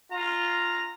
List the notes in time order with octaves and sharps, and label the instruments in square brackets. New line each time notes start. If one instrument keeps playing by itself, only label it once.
[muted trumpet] F4 [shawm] A#5